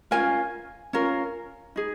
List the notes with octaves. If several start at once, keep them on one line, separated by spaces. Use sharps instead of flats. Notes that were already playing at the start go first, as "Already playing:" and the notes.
C#4 F4 A#4 G#5
C#4 F4 A#4
D#4 G#4